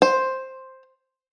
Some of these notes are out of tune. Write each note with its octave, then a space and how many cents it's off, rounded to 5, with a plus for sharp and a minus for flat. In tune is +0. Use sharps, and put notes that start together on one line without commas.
C5 +5